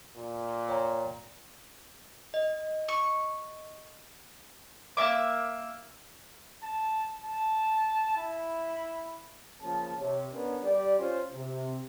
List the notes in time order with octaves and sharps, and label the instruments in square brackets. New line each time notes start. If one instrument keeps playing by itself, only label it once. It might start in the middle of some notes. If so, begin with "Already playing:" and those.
[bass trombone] A#2
[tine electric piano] C#5 G5 A#5
[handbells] D#5
[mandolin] C#6
A#3 C#4 E5 D6
[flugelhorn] A5
A5
E4
[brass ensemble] C#3 F3 A#3 A5
C3 C#5
B3 C#4 D4 A#4
G3 G4 D5
C#4 F4 C5
C3